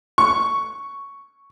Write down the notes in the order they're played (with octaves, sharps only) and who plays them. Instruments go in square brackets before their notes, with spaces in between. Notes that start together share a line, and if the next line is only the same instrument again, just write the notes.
[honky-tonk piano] C#6